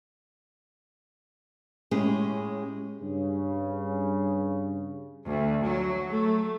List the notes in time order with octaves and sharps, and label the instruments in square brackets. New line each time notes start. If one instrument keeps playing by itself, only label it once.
[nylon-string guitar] A2 G#3 C#4 G4 G#4
[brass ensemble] G2 C#3
[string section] D2
F#3
A3